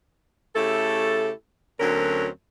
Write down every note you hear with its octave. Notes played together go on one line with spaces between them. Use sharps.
C#3 A3 E4 G4 A4
D2 D3 F#3 C4 C#4 A#4